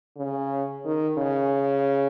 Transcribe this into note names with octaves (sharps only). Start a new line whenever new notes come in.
C#3
D#3
C#3